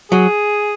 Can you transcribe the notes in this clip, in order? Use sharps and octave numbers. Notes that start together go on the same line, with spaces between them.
F#3 G#4